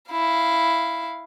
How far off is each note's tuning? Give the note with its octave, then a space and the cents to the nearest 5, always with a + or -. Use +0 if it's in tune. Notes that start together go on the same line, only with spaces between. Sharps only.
E4 +0 F5 -10